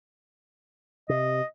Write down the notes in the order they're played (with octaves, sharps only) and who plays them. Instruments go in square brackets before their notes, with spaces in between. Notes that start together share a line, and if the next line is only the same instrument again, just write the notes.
[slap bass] C3 [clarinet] D#5